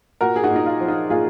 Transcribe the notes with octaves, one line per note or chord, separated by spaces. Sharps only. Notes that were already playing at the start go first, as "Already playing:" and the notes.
A#2 F#4 A#4
G#4
D#4 F#4
A#2
D#4
F4
F3
D#4
A#2 F4 G#4